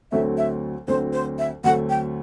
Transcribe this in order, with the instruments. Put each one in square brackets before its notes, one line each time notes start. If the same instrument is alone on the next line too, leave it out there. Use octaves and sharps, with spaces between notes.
[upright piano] D2 D3 F#3 A3 C4 [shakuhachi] E5
[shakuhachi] E5
[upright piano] D2 D3 F#3 A3 C4 [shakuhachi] C5
[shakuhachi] C5
E5
[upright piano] D2 D3 F#3 A3 C4 [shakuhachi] F#5
[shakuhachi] G5